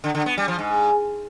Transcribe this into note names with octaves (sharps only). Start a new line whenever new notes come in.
D3
D3
B3
G3
F3
G#2